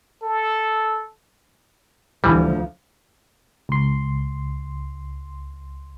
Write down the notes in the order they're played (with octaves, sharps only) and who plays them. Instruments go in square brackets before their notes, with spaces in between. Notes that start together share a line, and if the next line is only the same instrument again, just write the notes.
[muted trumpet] A4
[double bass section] D2 D3 F3 [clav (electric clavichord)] E3 G3
[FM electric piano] C#2 C6